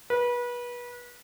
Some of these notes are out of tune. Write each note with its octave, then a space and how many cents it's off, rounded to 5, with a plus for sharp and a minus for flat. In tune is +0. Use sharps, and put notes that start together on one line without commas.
B4 -30